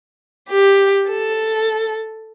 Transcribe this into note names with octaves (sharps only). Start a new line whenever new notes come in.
G4
A4